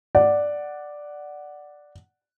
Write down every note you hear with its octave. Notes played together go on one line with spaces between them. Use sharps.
D5 F#5